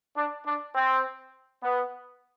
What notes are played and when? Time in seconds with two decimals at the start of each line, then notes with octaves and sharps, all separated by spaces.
0.16 D4
0.45 D4
0.75 C4
1.63 B3